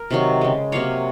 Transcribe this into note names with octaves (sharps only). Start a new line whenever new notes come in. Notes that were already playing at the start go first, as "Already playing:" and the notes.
Already playing: A#4
C3 D#3 F#3
C#3 G#3
C3 F#3 A#3 C#5 F5